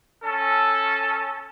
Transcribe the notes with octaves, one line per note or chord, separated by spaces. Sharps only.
C#4 A4